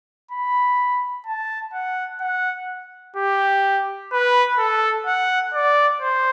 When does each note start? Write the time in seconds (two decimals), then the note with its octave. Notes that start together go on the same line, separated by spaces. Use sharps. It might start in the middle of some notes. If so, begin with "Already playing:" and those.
0.32 B5
1.27 A5
1.74 F#5
2.21 F#5
3.16 G4
4.12 B4
4.59 A4
5.07 F#5
5.54 D5
6.02 C5